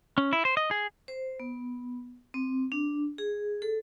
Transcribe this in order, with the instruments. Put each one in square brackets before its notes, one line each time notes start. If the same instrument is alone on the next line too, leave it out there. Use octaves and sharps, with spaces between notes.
[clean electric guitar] C#4
E4
C5
D#5
G#4
[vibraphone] C5
B3
C4
D4
G#4
A4